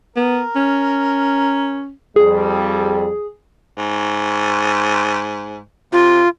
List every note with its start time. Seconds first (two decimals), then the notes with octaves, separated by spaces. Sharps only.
0.16 B3 A#4
0.56 C#4
2.16 F2 G3 G#4
3.77 G#2
5.93 C3 F4